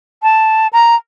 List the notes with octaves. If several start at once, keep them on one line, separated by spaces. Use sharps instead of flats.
A5
A#5